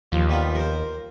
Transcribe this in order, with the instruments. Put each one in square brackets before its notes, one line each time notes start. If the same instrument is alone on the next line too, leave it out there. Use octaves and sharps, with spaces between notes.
[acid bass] D#2 [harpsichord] F3
[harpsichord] G3 B3 F4
A#4 C5